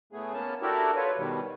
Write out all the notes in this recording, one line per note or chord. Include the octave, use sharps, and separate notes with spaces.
A2 A3 B3 G#4
A#3 B3 C#4 A5
D4 E4 F#4 G4 A4 A#4
F4 A4 B4 C#5
B2 D#3 G3